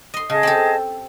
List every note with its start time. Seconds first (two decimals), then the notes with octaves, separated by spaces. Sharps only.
0.14 D#5 C6
0.30 C#3 G#4 D#5 A5
0.43 C4 G4 A4